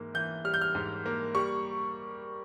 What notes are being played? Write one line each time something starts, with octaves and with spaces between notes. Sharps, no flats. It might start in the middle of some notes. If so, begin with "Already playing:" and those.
Already playing: G#2 E3 A#3
E3 G6
G3 F6
G6
F6
G#2
A#3
G3 C#6